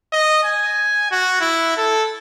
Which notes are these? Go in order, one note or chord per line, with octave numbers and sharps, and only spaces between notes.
D#5
G#5
F#4
E4
A4